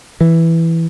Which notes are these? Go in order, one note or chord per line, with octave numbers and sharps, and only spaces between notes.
E3